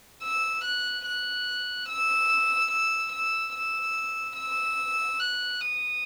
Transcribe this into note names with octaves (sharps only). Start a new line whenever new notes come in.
E6
F#6
F#6
E6
E6
E6
E6
E6
F#6
D#6